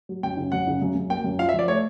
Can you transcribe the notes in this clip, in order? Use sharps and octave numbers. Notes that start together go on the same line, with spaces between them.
F#3
F#2 G5
C#3
F#2 F#5
C#3
F#2
F#2
A#3 G5
F#2
F4 F5
E5
F3
D5
A3 C#5